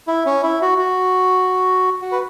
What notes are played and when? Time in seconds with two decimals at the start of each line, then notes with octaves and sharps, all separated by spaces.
0.08 E4
0.26 C#4
0.43 E4
0.62 F#4
0.78 F#4
2.02 F#4
2.12 B4